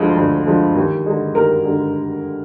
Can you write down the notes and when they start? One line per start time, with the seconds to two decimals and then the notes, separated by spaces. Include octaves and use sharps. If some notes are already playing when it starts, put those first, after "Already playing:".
Already playing: D2 D3 F3 G#3
0.17 D2
0.46 D3 F3 G#3
0.75 D#2
1.06 D3 G#3
1.35 D#2 A#4
1.64 D3 G#3